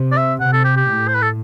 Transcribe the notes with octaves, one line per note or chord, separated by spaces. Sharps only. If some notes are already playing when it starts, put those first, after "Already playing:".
Already playing: C3
D5
E5
C3 F#5
A4
G4
G4
A2
C5
B4
A4